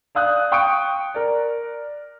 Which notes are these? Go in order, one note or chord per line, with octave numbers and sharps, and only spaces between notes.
D5 F5 D#6 F#6 G6
F5 G5 C#6 D#6 C#7 D7
A#4 D5